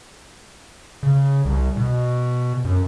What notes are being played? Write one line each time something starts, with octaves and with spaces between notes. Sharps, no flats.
C#3
C2
B2
F#2